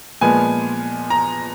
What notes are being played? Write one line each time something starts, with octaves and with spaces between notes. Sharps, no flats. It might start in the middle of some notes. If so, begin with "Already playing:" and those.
A#2 F3 G#3 B3 G#5
A#5